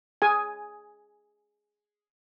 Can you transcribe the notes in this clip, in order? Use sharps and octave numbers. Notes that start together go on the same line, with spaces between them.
G#4 G#5